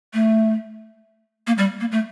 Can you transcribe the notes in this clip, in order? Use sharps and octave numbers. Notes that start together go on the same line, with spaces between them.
A3
A#3
G3
A#3
A3